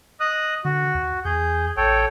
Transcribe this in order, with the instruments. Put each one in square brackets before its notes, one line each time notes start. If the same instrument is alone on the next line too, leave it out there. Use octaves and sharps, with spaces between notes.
[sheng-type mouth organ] D#5 D#6 F#6
[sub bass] D3 [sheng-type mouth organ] F#4
[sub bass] D#2
[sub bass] E2 [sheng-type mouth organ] G#4 G6
[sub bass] A1 [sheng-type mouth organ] A4 C#5 G5